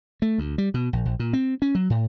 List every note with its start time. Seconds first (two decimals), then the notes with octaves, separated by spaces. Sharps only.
0.22 A3
0.38 D2
0.58 G3
0.74 B2
0.93 A#1
1.05 A#1
1.19 A#2
1.33 C4
1.62 C#4
1.75 F#3
1.90 A2